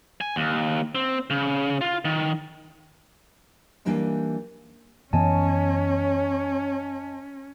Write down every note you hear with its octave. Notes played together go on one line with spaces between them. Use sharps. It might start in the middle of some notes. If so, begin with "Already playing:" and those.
G#5
D#2
C4
C#3
F4
D#3
E3 G3 A#3 D4 D#4
F#2 E3 B3 C#4 C#5 D#5 G#5 A5